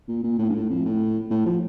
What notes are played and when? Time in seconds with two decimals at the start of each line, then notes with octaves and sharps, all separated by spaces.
0.08 A#2
0.23 A#2
0.38 A2
0.49 G2
0.54 A2
0.69 F2
0.85 A2
1.30 A2
1.45 F3